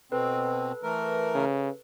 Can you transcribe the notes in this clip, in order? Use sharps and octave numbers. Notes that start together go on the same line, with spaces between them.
B2 C4 A4 B4
E3 A3 A#4
C#3